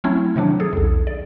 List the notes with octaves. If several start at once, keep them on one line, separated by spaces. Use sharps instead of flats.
F#3 A3 C4 C#4 E4
C3 D#3 F#3 D4
G#4 A4
B1 E2
D5